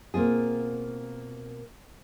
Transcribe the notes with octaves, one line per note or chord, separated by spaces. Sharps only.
B2 A#3 C4 F4 G#4